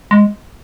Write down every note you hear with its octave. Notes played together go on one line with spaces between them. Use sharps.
G#3